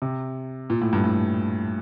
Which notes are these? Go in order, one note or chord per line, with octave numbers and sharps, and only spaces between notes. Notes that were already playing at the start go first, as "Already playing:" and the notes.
C3
A#2
A2
G2
A2